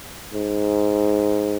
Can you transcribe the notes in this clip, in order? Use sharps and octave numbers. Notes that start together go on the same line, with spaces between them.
G#2